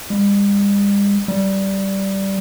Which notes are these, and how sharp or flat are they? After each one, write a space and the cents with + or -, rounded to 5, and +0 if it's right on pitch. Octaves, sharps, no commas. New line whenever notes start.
G3 +45
G3 -10